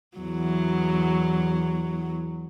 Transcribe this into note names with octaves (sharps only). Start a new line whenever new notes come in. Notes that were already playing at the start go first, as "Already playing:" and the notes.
E2 F#3